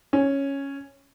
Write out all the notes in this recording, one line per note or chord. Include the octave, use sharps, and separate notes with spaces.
C#4